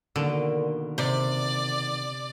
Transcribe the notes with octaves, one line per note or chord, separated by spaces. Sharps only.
B2 D3 D#3 A#3
C3 D5